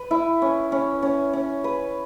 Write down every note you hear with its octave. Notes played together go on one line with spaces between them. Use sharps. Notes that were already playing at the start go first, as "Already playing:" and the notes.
Already playing: B4
E4
C#4
C#4
C#4
C#4
B4